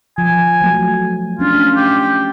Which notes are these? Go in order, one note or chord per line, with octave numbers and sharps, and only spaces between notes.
F3 G#5
F3 F#3 A3
A3 C#4 D4 F4
G4